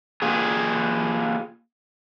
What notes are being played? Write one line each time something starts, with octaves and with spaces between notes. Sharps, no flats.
A#3 F4 G4 G#4